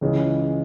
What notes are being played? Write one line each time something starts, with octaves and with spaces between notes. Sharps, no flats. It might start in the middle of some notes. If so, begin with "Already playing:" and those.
C#2 C#3 E3 G#3